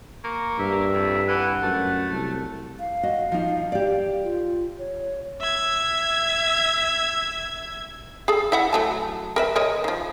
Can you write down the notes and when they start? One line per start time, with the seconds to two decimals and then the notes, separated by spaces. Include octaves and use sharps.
0.24 A#3 C#6
0.59 G2 E5
0.93 F2
1.28 E3 F#5
1.62 F#2 A3
2.09 C2
2.80 F5
3.03 F#4 D#5
3.32 F3 D#4
3.72 G4 D5
4.24 F4
4.79 C#5
5.41 E5 G#6
8.28 G#4 A4
8.52 E4 E5 F#5
8.73 F#3 A3 A5
9.36 A#4 B4 E5
9.56 A#4 C#5 D#5
9.84 D#3 F3